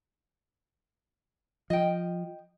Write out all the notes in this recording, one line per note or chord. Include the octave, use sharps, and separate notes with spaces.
F3 D#5 G5